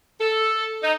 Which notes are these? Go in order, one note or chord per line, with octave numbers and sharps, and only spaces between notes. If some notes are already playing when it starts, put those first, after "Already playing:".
A4
D#4